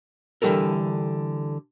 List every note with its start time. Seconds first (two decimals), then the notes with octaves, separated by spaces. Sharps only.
0.42 D3 E3 G3 F#4 A4 A#4